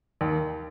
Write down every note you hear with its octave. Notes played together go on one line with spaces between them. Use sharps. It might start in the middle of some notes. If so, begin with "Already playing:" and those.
D#2